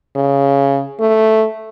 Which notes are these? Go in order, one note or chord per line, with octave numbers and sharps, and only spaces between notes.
C#3
A3